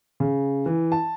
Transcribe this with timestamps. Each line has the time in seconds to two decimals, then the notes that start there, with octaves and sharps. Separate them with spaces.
0.20 C#3
0.66 E3
0.92 A5